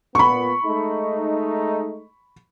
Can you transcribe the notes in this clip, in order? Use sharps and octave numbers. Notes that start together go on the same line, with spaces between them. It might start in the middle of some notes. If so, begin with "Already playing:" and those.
A#2 B3 B5 C#6
G#3 A3 D#4